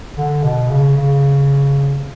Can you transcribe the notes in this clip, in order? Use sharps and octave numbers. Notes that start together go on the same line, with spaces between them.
D3
B2
C#3
C#3